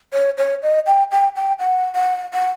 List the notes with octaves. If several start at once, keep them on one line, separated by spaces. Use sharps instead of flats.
C#5
C#5
D#5
G5
G5
G5
F#5
F#5
F#5